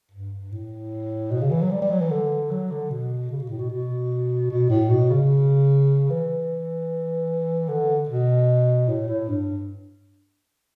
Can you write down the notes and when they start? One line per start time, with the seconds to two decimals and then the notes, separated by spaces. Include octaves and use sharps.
0.11 G2
0.52 A2
1.31 B2
1.41 C#3
1.51 E3
1.62 F#3
1.71 G3
1.82 G3
1.91 F#3
2.01 E3
2.11 D3
2.51 F#3
2.71 D3
2.90 B2
3.31 C#3
3.39 B2
3.49 A2
3.58 B2
3.70 B2
4.50 B2
4.69 A2
4.90 B2
5.10 C#3
6.10 E3
7.69 D3
8.09 B2
8.89 A2
9.08 A2
9.28 G2